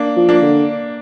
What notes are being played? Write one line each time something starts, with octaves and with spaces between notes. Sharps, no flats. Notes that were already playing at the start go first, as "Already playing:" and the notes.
Already playing: A#3 D4
F3
A#3 D4
D3